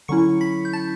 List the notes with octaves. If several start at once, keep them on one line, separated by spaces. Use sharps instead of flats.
D3 F#3 C#4 E4 C#6 C#7
B5 B6
G6
A5 A6